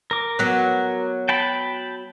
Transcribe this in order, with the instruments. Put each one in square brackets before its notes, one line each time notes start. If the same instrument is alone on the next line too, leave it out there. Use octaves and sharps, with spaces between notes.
[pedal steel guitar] A#4 D6
[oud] F#3 B3
[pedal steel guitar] G5 A5 B5